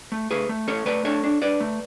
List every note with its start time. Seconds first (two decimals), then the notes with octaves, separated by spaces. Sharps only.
0.12 A3
0.31 A3 G#4 B4
0.49 A3
0.68 C#4 A4 C#5
0.86 A3 B4 D5
1.05 D4 A4 C#5
1.24 D4
1.42 D4 B4 D5
1.61 A3